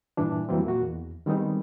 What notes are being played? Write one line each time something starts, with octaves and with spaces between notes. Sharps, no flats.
G2 A#2 E3 D4
E2 E3 F#3 G3 A#3 C4
A#2 A#3 F#4
E2
D#3 G3 G#3 B3 C4 D#4